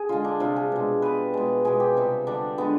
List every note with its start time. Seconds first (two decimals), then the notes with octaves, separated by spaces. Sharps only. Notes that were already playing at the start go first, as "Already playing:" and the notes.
Already playing: G#4
0.09 D3 G#3 F4
0.24 D4
0.40 C3 G3 F4
0.56 G#4
0.72 B2 G#3
1.02 B2 G3 B4
1.34 B2 G#3
1.65 B2 G#3 G#4
1.80 G4
1.97 C3 G3
2.27 D3 G3 D4
2.58 D3 G#3 B3